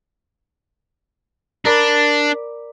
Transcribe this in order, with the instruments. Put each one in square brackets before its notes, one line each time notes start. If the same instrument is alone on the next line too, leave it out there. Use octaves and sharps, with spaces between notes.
[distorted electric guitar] D4 [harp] A#4 D5 B5